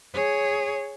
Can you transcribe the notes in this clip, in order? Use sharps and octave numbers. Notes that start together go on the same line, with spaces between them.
G#4 C#5